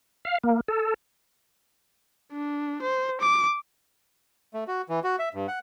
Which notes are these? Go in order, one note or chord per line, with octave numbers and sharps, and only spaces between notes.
F5
A#3
A4
D4
C5
D6
A3
F#4
E3
F#4
E5
G2
F#5